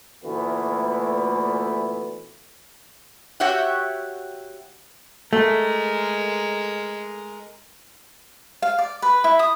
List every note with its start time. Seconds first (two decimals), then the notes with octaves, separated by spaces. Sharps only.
0.24 D2 A#2 E3 A3 B3
3.40 F#4 G4 C#5 E5 F#5
5.33 G#3 A3 A#4
8.62 F5
8.78 D5
9.02 B4
9.24 E4
9.39 D#6